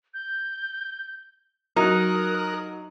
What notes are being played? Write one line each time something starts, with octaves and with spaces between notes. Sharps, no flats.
G6
F#3 D#4 A#4 D#6 F#6